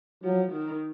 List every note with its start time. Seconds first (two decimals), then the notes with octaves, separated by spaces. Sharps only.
0.23 F3 F#3
0.52 D#3